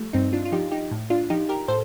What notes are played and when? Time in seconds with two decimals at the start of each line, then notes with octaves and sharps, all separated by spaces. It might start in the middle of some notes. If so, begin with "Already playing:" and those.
Already playing: F3 G3 A3
0.13 G2 C4 D#4
0.33 D4 F4
0.45 F4
0.52 F3 D#4 G4
0.72 D#4 G4
0.91 A2
1.10 D4 F4
1.30 F3 D#4 G4
1.49 G4 A#4
1.68 A2 A4 C5